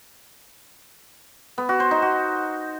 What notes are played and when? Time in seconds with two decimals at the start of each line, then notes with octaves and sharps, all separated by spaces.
1.58 B3
1.69 F#4
1.80 C5
1.91 D#4
2.02 F#4